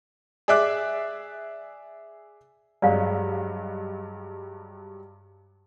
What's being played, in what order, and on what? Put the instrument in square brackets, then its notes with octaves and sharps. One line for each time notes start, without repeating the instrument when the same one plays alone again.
[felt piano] G#4 D5 E5 D6 F#6
[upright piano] G2 F#3 G#3 [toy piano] D5 F5